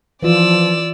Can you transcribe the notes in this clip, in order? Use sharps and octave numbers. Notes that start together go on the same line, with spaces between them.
E3 F3 F4 D5 E6